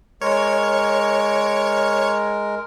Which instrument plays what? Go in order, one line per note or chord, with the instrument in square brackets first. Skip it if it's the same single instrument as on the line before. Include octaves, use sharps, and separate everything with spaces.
[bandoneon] G#3 A#4 [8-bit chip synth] C#5